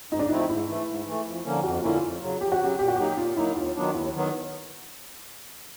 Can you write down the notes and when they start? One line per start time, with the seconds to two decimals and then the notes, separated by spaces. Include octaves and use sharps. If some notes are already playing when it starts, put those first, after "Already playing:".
0.11 G#2 D#4
0.19 D4
0.29 F3 A3 C4 D#4 E4
0.39 D#4
0.49 G#2 E4
0.68 E3 A3
0.87 G#2
1.07 E3 A3
1.25 F2
1.45 D3 F3 A#3 C#4
1.63 F2 F#4
1.75 F4
1.83 D3 F3 A#3 C#4 E4
1.96 F4
2.02 F2
2.22 C#3 F#3
2.41 F2 G4
2.52 F#4
2.60 C#3 F#3 G4
2.79 A#2 G4
2.88 F#4
2.96 F#3 A#3 D#4 G4
3.17 A#2 F4
3.36 F#3 A#3 D#4 E4
3.56 D#2 F4
3.75 D#3 F#3 B3 D4
3.95 D#2 E4
4.14 D#3 F#3 B3